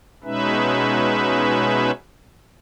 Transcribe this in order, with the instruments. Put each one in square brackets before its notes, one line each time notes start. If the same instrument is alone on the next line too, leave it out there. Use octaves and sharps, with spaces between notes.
[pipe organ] B2 G#3 C#4 D#4 B4 E5